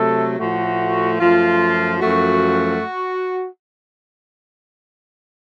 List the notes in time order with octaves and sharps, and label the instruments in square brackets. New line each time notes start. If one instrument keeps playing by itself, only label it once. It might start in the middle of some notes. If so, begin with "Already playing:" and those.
Already playing: [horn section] C3 F#3 A3 A4
A2 F3 A3 F#4
F#2 F3 A3 F4
F#2 F3 A3 F#4